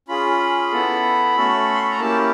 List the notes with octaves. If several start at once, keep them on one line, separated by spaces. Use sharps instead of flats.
C#4 F4 G#4 B5
B3 E4 A4
A3 C#4 F#4 A4
C6
B5
A#5
A#3 C#4 E4 G4 A5